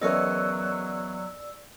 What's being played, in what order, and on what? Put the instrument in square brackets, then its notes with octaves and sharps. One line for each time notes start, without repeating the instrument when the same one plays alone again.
[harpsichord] E2 C#4 [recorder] F#3 [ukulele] A#4 D#5 [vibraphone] D5 E6